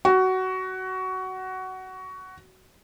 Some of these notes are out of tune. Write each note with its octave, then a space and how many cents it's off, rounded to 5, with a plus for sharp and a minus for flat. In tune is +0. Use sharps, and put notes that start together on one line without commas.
F#4 +15